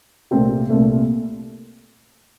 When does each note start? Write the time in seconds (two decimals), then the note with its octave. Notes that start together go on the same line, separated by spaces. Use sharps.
0.31 C2 A#2 A3 C4 G4
0.69 C2 A#2 A3